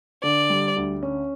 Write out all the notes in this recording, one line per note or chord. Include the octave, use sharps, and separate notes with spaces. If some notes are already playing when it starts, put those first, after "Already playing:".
D3 D5
G3
D2
C#4